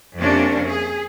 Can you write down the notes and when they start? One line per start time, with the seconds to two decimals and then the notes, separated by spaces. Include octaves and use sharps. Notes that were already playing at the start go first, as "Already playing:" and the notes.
0.17 F2 C3 A#3 C#4 D4
0.67 G#4